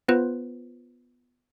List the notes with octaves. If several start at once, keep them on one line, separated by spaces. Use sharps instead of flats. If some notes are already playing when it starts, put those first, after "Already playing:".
B3 F4 B4 C5